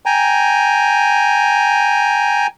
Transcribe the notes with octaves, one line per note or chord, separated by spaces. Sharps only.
G5 G#5 A#5